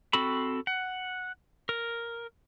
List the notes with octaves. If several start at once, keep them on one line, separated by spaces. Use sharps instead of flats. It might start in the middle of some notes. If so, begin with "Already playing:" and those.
C4 F#4 A4 B5
F#5
A#4